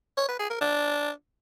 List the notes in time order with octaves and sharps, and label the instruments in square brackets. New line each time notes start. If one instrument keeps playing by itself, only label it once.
[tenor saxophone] C#5
B4
G#4
A#4
D4